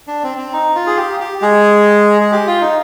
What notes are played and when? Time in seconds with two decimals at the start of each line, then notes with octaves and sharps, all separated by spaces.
0.07 D4
0.23 C4
0.37 C4
0.53 D#4
0.75 F4
0.87 G#4
0.97 G4
1.20 G4
1.42 G#3 G#4
2.20 G#4
2.32 G4
2.47 F4
2.62 D#4